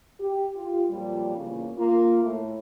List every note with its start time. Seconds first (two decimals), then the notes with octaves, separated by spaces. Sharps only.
0.19 G4
0.54 F4 G4
0.89 F2 A#2 F#3 G3
1.36 E2 A#2 C#3 A#3 C#4
1.76 A#3 F4
2.22 A2 A3